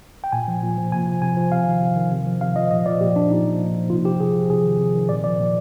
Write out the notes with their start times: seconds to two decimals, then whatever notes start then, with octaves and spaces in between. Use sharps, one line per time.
0.24 G5
0.32 A#2 G#5
0.48 F3
0.63 A#2
0.78 F3
0.92 C3 G#5
1.07 F3
1.22 C3 G#5
1.37 F3
1.52 C3 F5
1.67 D#3
1.81 C3
1.96 D#3
2.12 C3
2.27 F3
2.41 C3 F5
2.56 F3 D#5
2.71 A#2 D#5
2.86 F3 D5
3.01 A#2 G4
3.16 F3 D4
3.31 A#2 D#4
3.45 F3
3.61 A#2
3.75 F3
3.90 C3 F4
4.05 F3 G4
4.20 C3 G#4
4.35 F3
4.50 C3 G#4
4.64 D#3
4.79 C3
4.94 D#3
5.09 A#2 D5
5.24 F3 D5
5.39 A#2